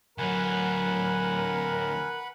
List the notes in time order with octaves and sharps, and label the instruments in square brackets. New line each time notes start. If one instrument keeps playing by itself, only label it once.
[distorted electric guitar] D2 F#3 [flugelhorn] A#4 [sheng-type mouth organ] B4 F#5 [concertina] G#5